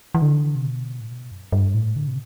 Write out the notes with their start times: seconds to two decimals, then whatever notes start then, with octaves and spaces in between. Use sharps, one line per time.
0.15 E3
0.22 D3
0.55 C3
0.66 B2
1.00 A2
1.09 B2
1.31 F#2
1.52 G2
1.74 A2
1.96 D3
2.07 C3